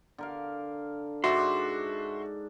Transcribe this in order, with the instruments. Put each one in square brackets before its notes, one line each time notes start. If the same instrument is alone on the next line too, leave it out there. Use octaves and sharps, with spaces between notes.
[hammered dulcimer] D3 A#4 F5
[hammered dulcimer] G#2 D4 D6 [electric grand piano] F#4 E5 [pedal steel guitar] C6